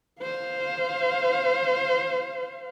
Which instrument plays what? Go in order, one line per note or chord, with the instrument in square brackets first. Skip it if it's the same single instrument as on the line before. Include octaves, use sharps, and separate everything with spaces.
[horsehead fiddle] C5 F5